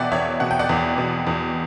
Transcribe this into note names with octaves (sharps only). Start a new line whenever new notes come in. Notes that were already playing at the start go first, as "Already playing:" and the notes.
Already playing: E2 B2 D5 E5 F#5 G5
E2 C#5 E5
B2 F#5
G5
D5 F#5
E2
B2
E2